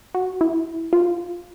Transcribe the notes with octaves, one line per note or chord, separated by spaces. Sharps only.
F#4
E4
F4